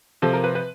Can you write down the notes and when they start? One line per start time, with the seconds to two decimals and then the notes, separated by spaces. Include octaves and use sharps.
0.22 C3 F3 A4
0.33 A#4
0.44 B4
0.55 B4